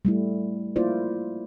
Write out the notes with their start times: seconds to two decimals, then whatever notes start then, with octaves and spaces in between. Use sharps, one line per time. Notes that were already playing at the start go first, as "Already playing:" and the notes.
0.05 G3 A3 E4
0.76 A#3 E4 F4 C5 D5